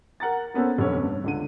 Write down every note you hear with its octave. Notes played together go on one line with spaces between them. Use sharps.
A#4 F#5 A#5 A6
A#3 B3 C#4 A4 C5
F1 B1 D3 A4 C#5
G2
C#2 D3 D#7